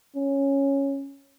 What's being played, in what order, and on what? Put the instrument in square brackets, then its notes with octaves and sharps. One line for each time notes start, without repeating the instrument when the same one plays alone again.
[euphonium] C#4